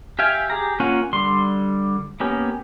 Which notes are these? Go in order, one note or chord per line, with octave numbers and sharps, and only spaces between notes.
G4 E5 F5 G5 G#5
G4 G#4 A#5
A#3 C#4 F4 F#5 G#5
D3 G3 C6
A#3 B3 C#4 G4